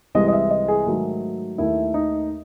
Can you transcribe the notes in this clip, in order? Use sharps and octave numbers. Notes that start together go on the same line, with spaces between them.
C2 C3 E3 G#3 D#5
D#5
E5
D#5
G#4
G#2 D#3 F#3 A3
D#2 D#3 A3 E4
D#4